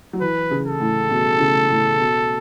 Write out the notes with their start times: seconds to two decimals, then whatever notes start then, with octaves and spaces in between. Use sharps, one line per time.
0.13 F#3
0.21 E3 B4
0.51 C#3
0.66 A4
0.80 A2
1.11 B2
1.40 C#3
1.69 A2
1.99 B2